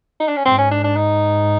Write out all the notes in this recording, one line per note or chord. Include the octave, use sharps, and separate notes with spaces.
D#4
D4
C#4
G#2 C4
C#4
D4
D4
D#4